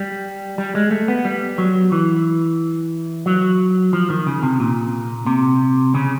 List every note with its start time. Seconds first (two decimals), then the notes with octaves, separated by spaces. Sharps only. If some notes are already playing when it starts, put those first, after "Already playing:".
Already playing: G3
0.58 G3
0.75 G#3
0.91 A3
1.08 B3
1.25 G3
1.58 F#3
1.92 E3
3.26 F#3
3.93 F3
4.10 D#3
4.27 C#3
4.43 C3
4.60 A#2
5.26 C3
5.95 C#3